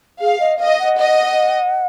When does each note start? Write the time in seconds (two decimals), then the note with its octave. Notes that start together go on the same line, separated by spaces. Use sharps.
0.21 G#4 F5
0.40 D#5
0.59 D#5 F5
0.79 F#5
0.98 D#5